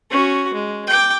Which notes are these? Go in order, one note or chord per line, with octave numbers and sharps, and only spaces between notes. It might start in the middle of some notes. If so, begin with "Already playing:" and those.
C#4 F#4
G#3
G5 D6